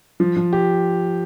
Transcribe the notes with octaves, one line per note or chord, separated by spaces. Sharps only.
F3
F3
G4